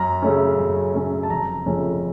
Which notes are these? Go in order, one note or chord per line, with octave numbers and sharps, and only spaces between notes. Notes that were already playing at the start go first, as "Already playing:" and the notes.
Already playing: F#2 A#5
C#3 A3 C#4
F#2
C#3 A3 C#4
A5
F1 A#5
F2 C#3 A3 C#4